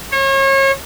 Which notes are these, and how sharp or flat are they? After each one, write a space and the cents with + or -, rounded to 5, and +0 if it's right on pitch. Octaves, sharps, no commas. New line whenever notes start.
C#5 -35